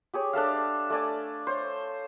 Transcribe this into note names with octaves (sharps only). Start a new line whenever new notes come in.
G4 G#4 C#5
D4 A4 E5 F5
A3 D5 G#5
C5 C#5